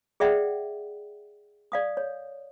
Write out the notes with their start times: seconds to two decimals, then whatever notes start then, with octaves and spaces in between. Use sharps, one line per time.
0.20 G#4 D5 E5 F#5 G5
1.72 D5 F5 D#6
1.97 C#5